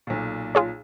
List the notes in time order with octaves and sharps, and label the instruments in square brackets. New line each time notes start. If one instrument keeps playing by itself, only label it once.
[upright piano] B1 A#2
[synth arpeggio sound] F4 G#4 C#5